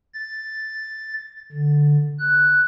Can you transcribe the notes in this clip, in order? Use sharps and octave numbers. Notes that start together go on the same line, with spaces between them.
A6
D3
F#6